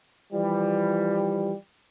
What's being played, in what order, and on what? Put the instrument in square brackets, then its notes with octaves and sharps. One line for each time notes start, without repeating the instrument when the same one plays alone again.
[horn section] E3 F3 G3